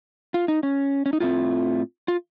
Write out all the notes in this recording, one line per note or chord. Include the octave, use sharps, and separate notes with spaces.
F4
D#4
C#4
C#4
D#4
A2 A3 C4 F4
F4